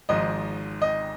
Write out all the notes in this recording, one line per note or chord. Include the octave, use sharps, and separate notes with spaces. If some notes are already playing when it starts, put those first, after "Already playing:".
G#1 G#2 F3 D#5
D#5